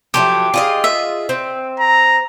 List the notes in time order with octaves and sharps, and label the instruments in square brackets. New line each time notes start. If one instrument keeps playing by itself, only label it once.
[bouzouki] F3 F#3 A3 [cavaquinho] G4
[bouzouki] F4 G#4 D#5
[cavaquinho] E5
[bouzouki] C4
[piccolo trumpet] A#5